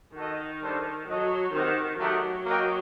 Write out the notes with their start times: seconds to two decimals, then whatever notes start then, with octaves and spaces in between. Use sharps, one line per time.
0.15 D#3 F#4 A4 D#5
0.61 G3 D4 A4 C5
1.07 F#3 F#4 A4 D#5
1.53 D#3 C4 G4 C5 D#5 F#5
2.00 F#3 A3 D#4 G4 A#4 F#5
2.46 A#3 F#4 A#4 D#5 G5